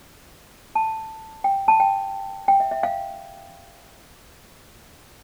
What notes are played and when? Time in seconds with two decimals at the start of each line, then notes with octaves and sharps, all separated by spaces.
0.75 A5
1.44 G5
1.68 A5
1.80 G5
2.48 G5
2.60 E5
2.71 E5
2.83 F5